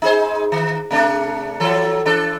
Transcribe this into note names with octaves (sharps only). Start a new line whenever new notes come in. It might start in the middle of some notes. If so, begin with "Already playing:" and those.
D#4 G#4 C5
D#3
C3 A3 D4
E3 F#3 A4
E3 D4 A4